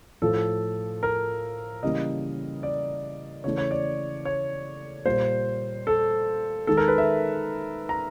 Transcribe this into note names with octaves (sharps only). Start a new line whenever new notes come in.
A2 F3 A3 A4
A#4
C#3 E3 G3 A#3 D#5
D5
C#3 E3 A3 C#5
C#5
D5
C#5
A#2 G3 A#3 C5
A4
D#3 G#3 A4
A#4
B4
E5
A#5